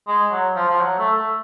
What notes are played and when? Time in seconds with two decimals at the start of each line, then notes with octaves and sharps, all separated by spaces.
0.08 G#3
0.31 F#3
0.56 F3
0.68 F3
0.81 F#3
0.98 A3
1.16 A3